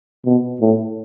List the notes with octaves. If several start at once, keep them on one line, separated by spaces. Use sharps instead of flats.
B2
A2